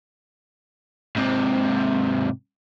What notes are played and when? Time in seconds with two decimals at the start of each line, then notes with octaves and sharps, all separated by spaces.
1.17 G#2 C3